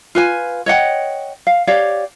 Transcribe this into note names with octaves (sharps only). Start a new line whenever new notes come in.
F4 B4 G#5
C#5 D#5 F#5 G5
F5
G4 C#5 D5 F5